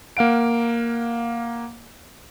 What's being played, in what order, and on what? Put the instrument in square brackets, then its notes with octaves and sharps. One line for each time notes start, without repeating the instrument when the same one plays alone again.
[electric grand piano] A#3 F5 F#5 D7